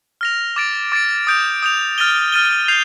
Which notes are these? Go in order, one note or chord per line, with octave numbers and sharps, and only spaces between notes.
F6 A#6 F7
D6 A6 D7
D6 A6 D7
D#6 G6 D7 F7
D#6 G6 D7 F7
F6 A6 D#7 G7
F6 A6 D#7 G7
G6 C7 F7